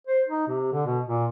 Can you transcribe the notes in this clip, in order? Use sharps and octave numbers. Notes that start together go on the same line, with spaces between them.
C5
D#4
C3
D3
B2
A#2